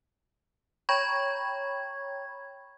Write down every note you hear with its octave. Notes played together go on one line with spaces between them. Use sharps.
C#5 G5 A#5 B5 C#6 G#6